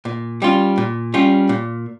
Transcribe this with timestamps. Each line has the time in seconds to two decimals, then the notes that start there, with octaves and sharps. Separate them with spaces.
0.05 A#2
0.42 G3 C#4 F4
0.78 A#2
1.14 G3 C#4 F4
1.49 A#2